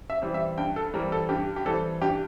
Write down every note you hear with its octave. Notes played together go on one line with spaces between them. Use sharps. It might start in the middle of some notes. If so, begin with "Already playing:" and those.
E5
E3 G3 C4
E5
G2 G5
A4
E3 G3 C4 A#4
A4
G2 G4
G4
E3 G3 C4 A4
G2 G4